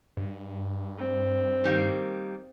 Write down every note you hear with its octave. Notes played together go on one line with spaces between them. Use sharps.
G2
C4
D#3 G3 A#3